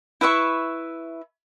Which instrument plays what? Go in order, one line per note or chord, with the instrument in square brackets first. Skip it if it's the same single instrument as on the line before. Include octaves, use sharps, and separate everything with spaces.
[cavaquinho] E4 B4 E5 C#6